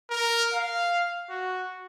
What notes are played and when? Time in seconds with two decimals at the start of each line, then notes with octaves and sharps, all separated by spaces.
0.10 A#4
0.53 F5
1.30 F#4